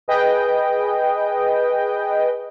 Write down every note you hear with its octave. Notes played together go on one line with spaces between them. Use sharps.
G#4 B4 D#5 G5